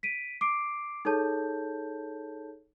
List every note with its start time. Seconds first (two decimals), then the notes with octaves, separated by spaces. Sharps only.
0.03 B6 D7 D#7
0.41 D6 C7 D7
1.05 D#4 G#4 A4 C#5 A5 G6